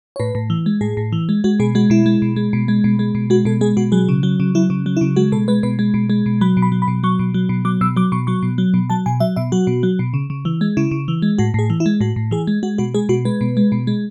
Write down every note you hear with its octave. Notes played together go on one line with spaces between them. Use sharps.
C#5
A2 B4
A2
E3
G#3
A2 G#4
A2
E3
G#3
G#3 F#4
B2 G#4
G#3 F#4
B2 E4
G#3
B2
G#3
B2
G#3
B2
G#3
B2
G#3 F#4
B2 A4
G#3 G#4
B2 F#4
F#3 G#4
C#3
F#3
C#3
F#3 E4
C#3
F#3
E4
C#3
G#3 F#4
B2 A4
G#3 B4
B2 B4
G#3
B2
G#3
B2
F#3 B5
B2
B5
F#3
B5
B2
F#3 C#6
B2
F#3
B2
F#3 D6
B2 E6
F#3 D6
B2 C#6
F#3 C#6
B2
F#3
B2
F#3 A5
B2 G#5
F#3 E5
B2 E5
F#3 F#4
B2
F#3
B2
C#3
C#3
E3
G#3
C#3 E4
C#3
E3
G#3
A2 F#4
A2 G#4
E3
E4
G#3
A2 F#4
A2
E3 G#4
G#3
G#3 F#4
B2 F#4
G#3 G#4
B2 F#4
G#3 B4
B2
G#3
B2
G#3